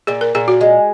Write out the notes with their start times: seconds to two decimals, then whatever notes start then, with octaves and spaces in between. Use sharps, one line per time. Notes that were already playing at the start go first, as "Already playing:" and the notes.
0.07 A#2 G#4
0.21 A#4
0.35 A#2 G#4
0.48 F#4
0.61 G#3